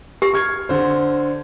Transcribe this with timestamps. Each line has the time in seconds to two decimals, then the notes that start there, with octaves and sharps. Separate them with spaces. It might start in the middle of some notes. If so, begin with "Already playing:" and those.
0.22 G4
0.34 C#6 F6 G#6
0.69 D3 C5